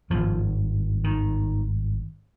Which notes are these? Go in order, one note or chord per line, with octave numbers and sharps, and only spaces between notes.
G#1 G2 F3
D#3